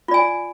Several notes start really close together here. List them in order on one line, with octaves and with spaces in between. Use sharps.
F4 D5 G#5